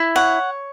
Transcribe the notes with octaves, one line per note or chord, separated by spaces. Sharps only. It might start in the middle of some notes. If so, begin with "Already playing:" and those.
Already playing: E4
C#5 F#5